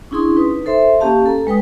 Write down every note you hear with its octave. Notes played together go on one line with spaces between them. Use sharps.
C#4 D4 E4 G#4 C6 D#6
D#4 B4
A4 C5 E5 C6
A#3 C#4 G4 F5 A5
A4 A#5
G#3 B4 G5 D#6